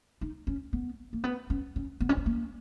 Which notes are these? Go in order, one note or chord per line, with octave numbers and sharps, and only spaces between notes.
D#4
C#4
B3
A#3
B3
C#4
C#4
B3
C#4
B3
A#3